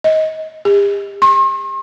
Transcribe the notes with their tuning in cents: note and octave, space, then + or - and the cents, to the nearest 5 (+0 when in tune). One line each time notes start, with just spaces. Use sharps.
D#5 +20
G4 +40
C6 +45